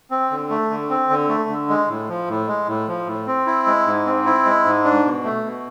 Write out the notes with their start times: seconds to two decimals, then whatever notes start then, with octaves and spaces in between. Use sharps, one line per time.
0.11 C4
0.31 D3
0.50 A3
0.70 D3
0.89 C4
1.10 D3
1.29 A3
1.49 D3
1.69 G#3
1.89 A2
2.09 F3
2.28 A2
2.47 G#3
2.68 A2
2.88 F3
3.07 A2
3.27 C4
3.46 E4
3.66 G#3
3.86 G#2
4.06 C4
4.26 E4
4.45 G#3
4.65 G#2
4.84 D4
5.04 B2
5.24 A3
5.43 B2